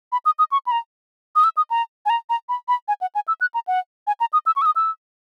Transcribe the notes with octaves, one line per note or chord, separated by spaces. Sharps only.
B5
D#6
D#6
C#6
B5
A#5
D#6
E6
D#6
A#5
G#5
A#5
A#5
B5
B5
G#5
F#5
G#5
E6
F#6
A#5
F#5
G#5
A#5
D#6
E6
C#6
E6
D#6
E6